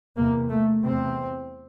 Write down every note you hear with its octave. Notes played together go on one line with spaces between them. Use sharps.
E2 C3 A#3
A3
E2 C3 C4